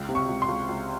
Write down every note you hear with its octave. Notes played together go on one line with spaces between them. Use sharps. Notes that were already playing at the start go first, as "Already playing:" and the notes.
Already playing: C#2
C3
C#6
C#2
C6
C#2
C#2